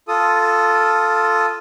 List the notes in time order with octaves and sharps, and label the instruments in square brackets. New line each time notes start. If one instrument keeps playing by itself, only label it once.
[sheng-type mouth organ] F4 A4 D#6